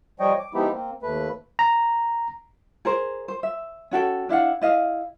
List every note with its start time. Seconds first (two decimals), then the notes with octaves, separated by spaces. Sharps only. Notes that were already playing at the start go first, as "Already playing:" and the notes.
0.20 F3 G3 C#5 D#5 G5
0.39 D6
0.54 F3 G#3 B3 D#4 E4 G4
0.72 A#3 C4
1.02 D#2 A3 B4
1.59 A#5
2.85 G#4 A#4 C5
3.28 C5
3.43 E5
3.91 C#4 F#4 A4 G5
4.29 D4 E4 F5 F#5
4.62 E4 D#5 F5